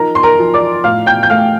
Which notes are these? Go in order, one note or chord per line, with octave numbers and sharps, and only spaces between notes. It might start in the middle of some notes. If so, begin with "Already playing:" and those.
Already playing: F3 D#4 A#4 A#5
C6
A#4 A#5
F3
D5 D6
A2 F5 F6
G5 G6
G6
A3 F5 F6